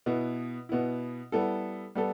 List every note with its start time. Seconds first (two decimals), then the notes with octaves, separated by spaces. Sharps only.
0.06 B2 B3 E4
0.69 B2 B3 E4
1.32 G3 B3 E4 A4
1.95 G3 B3 A4